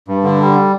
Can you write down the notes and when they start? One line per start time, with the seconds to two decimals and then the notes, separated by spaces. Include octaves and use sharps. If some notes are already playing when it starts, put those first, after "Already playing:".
0.08 G2
0.24 D3
0.41 G3